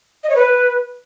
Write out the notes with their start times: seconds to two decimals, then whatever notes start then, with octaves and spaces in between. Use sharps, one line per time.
0.24 D#5
0.30 C#5
0.36 B4